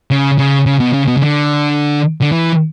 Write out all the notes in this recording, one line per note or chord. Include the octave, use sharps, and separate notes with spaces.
C#3
C#3
C#3
B2
C#3
B2
C#3
D3
D3
E3